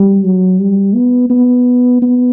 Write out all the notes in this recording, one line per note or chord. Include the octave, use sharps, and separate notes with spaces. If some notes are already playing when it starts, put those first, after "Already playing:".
Already playing: G3
F#3
G3
B3
B3
B3